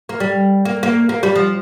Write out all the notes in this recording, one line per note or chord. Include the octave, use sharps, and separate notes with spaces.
A#3
G3
A#3
A#3
A#3
G3
F3